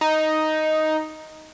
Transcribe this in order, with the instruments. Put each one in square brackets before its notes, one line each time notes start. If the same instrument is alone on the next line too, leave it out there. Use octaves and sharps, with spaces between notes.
[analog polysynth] D#4